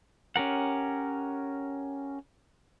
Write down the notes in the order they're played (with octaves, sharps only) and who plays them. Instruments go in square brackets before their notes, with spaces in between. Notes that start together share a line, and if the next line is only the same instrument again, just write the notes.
[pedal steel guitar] C#4 G4 A#4 F#5